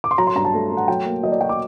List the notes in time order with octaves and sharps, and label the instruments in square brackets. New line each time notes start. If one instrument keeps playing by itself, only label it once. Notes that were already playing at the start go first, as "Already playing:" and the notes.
[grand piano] D6
C6
[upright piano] F#3 [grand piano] A#5
[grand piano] C6
[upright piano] G2 [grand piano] A#5
[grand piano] A5
[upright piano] A3
A3
[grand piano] F#5
[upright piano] F#3 [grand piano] G5
[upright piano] A#3
[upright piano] F#3 [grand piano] D#5
[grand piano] D5
[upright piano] F#4 [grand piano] G5
[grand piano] D6